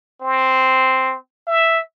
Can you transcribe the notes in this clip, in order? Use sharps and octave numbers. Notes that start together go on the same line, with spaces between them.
C4
E5